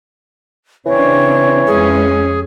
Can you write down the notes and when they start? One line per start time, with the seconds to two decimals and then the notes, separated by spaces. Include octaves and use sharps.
0.86 C#3 E3 C4 D4 C#5
1.67 F2 G#3 C#4 G#4